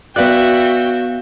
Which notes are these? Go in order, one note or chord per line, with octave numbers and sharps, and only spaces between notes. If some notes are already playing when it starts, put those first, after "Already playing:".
B3 F#4 B4 D5 E5 F5 G5 F#6